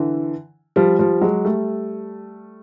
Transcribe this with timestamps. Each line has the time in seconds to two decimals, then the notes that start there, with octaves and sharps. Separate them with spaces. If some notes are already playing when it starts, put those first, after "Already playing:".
Already playing: D3 E3
0.76 F3 G3
0.99 F3 G3
1.21 F#3 G#3
1.45 G3 A3